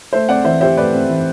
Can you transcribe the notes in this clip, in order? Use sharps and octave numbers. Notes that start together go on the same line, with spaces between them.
A3 C5 E5
C4 D5 F#5
E3 C5 E5
G4 C5 E5
A3 B4 D5
C4
E3